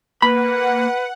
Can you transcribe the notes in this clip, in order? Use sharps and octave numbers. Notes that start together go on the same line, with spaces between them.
A#3 B4 F#5 B5